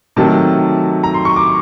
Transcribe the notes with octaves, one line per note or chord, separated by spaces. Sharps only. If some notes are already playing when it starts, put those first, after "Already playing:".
C3 D#3 F#3 A3 A5
A#5
C6
C#6
D6